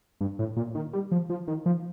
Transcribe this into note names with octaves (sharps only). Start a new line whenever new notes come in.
G2
A2
A#2
D#3
G3
F3
F3
D#3
F3